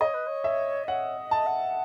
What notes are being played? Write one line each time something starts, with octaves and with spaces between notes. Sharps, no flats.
C#5 D#5
B4
C#5
E5
D#5
C#5 F#5
D#5
A5
F#5